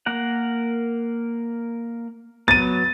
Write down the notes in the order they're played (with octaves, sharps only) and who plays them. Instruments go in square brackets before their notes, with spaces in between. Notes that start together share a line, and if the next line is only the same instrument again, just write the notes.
[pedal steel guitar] A#3 A#4 F#5
[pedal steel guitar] F#3 B3 [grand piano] A6 D#7